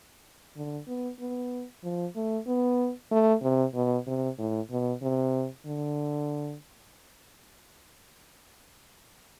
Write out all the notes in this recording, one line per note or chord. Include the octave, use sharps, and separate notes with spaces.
D3
B3
B3
F3
A3
B3
A3
C3
B2
C3
A2
B2
C3
D3